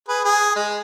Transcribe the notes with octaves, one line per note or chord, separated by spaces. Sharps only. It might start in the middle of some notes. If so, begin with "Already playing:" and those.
G#4 B4
G#4
G#3